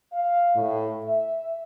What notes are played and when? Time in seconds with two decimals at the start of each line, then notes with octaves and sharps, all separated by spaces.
0.13 F5
0.55 A2
1.04 E5